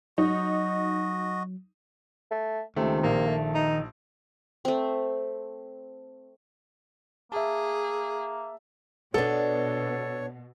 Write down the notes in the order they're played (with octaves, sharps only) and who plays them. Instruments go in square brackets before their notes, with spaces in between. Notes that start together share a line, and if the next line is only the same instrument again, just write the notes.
[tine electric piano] F#3 [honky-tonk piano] D#4 [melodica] F#4 D#5
[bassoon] A3
[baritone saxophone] C#2 [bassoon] C3 [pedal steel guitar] D#3 [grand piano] A3
[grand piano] A#1 [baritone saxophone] A#3
[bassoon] A3
[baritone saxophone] D#4
[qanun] A3 C4
[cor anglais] A#3 [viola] G#4 [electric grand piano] E5 A5
[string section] B2 [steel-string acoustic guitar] B3 D4 [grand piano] A4 [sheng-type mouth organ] C#5